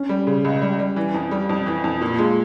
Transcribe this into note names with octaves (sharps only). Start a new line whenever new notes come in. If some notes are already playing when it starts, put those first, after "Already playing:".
Already playing: C#4
G3
C#3
C#2
G3
G3
E3
F2
G3
F2
E3
F2
A#2 F4
G#3 F4